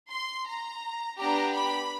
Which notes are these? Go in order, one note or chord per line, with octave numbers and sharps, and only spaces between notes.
C6
A#5
B3 D4 G4 A#5
B5